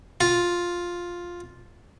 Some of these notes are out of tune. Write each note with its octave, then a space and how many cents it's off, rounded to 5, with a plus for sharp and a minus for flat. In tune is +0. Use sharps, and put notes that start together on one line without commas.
F4 +5